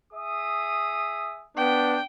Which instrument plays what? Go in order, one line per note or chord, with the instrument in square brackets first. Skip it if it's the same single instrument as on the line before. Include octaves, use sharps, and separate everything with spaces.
[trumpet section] G#4 E5 D#6
[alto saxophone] B3 [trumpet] D4 [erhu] G5